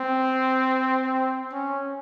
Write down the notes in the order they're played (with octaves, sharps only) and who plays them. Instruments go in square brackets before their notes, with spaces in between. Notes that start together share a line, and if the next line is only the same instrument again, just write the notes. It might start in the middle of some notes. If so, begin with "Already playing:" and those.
Already playing: [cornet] C4
C#4